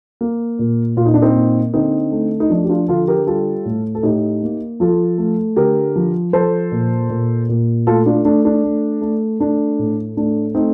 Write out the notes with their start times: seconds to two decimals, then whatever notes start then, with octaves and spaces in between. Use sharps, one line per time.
0.21 A#3
0.59 A#2
0.97 A#2 F4
1.06 D#4
1.14 D4
1.22 C4 D#4
1.36 A#3
1.74 D3 C4 D#4
2.12 A3
2.40 D#4
2.50 F3 D4
2.64 G4
2.69 D4 F4
2.88 D3 F4 A4
3.08 G4 A#4
3.27 G3 F4 A4
3.65 A2
3.95 A4
4.03 A2 D#4 G4
4.43 A#3
4.80 F3 F4 A4
5.18 A3
5.56 D3 G4 A#4
5.96 F3
6.33 F3 A4 C5
6.72 A#2
7.10 A#2
7.49 A#2
7.87 A3 F4 A4
8.06 D4 F4
8.25 A3 D4
8.45 D4
8.63 A3
9.01 A3
9.40 A3 D4
9.79 A2
10.17 A3 D4
10.55 A3 C4 D#4